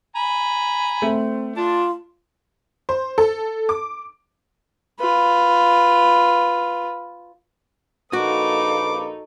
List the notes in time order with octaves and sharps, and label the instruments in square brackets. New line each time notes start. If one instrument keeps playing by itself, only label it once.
[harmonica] G#5 A#5 B5
[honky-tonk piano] A3 [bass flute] C4
[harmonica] D4 A5 [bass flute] F4
[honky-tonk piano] C5
A4
D6
[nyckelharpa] F4 B4
[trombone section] A#1 A#3 B4 [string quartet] D#4 A4 [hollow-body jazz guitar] F#4 [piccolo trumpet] D6